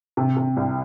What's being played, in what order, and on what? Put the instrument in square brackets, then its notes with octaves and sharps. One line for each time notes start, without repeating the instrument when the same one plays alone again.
[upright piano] C3
C3
C2